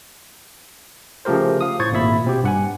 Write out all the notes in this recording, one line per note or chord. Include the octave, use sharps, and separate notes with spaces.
C#3 F3 A3 G4 A#4 C5
F5 D#6
A2 C5 C#6 G#6 A6
G#1 A#2 A#3 E5 B5
B2 C4 G4
G2 F#5 G#5